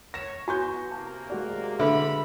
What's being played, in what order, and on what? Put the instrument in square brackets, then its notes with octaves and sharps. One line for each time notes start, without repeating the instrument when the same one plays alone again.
[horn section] C#5 [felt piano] A#6 E7
[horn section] B3 [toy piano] F#4 [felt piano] G#5 C#6 G6
[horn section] C3 A#3 [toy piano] A5
[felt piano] G#3 F#4 D5
[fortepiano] D3 [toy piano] B4 E5 [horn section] B5